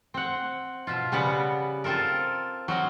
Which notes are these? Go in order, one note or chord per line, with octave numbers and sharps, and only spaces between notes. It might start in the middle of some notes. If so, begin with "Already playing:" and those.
C4 F#5
B2 F3 F4
C#3 G3 B3 B4 F#5
C4 F4 A4 A#4
F#3 C4 A#4 D#5